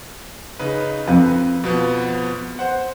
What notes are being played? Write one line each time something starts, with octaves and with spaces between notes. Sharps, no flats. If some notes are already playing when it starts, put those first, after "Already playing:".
C#3 D#4 B4
F2 B4
B2 F3 B3
C5 F#5